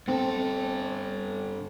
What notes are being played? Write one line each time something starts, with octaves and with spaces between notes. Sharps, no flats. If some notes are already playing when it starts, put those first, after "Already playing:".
G2 C4 A4